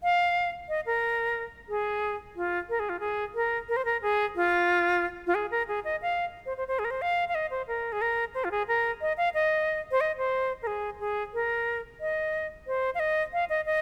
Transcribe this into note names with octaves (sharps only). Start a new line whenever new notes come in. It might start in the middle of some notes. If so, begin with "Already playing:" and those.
F5
D#5
A#4
G#4
F4
A#4
G#4
F4
G#4
A#4
A#4
C5
A#4
G#4
F4
F4
G#4
A#4
G#4
D#5
F5
C5
C5
C5
G#4
A#4
C5
F5
F5
D#5
C5
A#4
G#4
A#4
C5
F4
G#4
A#4
D#5
F5
D#5
C5
D#5
C5
A#4
G#4
G#4
A#4
D#5
C5
F5
D#5
F5
D#5
D#5